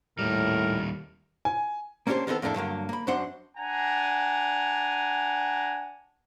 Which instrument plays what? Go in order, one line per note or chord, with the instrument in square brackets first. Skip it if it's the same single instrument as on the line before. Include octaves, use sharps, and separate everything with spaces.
[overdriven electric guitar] D#2 G3 [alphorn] A2 [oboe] A#4
[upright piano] G#5
[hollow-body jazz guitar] A#3 C#4 D4 F#4 G4 C5
D#3 B3 C4 E4 A4
F2 A2 A#3 D4 A4
G2 D3 F#3 A#3
A#3 B5
F#2 F#3 D4 C5 F#5 C6
[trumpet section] D4 F#5 G#5 A#5